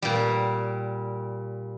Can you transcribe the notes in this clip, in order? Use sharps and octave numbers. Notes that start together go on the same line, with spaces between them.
A#2 G3